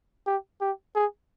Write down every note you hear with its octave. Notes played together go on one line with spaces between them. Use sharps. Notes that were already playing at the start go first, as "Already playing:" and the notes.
G4
G4
G#4